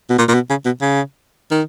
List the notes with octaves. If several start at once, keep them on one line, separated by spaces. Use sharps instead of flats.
B2
A#2
A#2
B2
C#3
B2
C#3
D#3